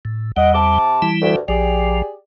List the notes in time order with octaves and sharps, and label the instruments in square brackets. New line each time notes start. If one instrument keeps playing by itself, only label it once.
[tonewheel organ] A2
[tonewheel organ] E2 G3 [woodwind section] D#5 F#5
[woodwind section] C3 A5 D6
[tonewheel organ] E3 G3 E4
[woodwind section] D2 G2
[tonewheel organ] A#1 F3 [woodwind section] G4 G#4 D5